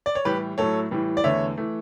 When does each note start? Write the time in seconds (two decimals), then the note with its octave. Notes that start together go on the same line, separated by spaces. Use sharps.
0.06 D5
0.15 C#5
0.25 A2 E3 G3 G4 B4
0.58 A2 F#3 A3 A4 C#5
0.91 A2 E3 G3
1.17 D5
1.24 E2 D3 A3 C#5 E5
1.58 E3 A3